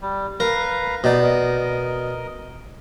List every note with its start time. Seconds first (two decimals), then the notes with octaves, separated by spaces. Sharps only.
0.01 G3
0.40 A#4 B4 F5 A#5
1.04 B2 D#4 D5
1.23 A#4 D#5